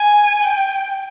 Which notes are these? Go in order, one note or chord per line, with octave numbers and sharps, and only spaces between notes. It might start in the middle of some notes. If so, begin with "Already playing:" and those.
Already playing: G#5
G5